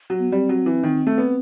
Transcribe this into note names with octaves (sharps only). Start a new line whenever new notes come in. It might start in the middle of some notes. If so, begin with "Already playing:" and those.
F#3
B3
G3 C4
F#3
E3
D#3
A3
B3